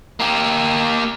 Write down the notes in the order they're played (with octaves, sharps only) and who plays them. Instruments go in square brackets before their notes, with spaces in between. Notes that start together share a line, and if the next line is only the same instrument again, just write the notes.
[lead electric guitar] A#3 G4